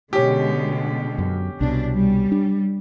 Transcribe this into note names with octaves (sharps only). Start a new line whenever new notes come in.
B2 D3 G#3 C#4 G4
F#2
C2 B2 D4
G3
D4